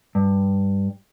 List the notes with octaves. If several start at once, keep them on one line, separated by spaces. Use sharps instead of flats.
G2